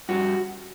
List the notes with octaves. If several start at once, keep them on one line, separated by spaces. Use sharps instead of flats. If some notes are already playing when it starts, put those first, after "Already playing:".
G2 F#4